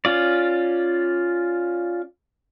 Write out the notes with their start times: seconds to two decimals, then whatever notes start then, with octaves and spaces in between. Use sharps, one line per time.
0.05 C#4 F4 D5